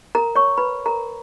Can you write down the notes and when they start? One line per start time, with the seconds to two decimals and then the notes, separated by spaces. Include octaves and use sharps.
0.15 A#4 A#5
0.35 C#5 C#6
0.57 B4 B5
0.86 A#4 A#5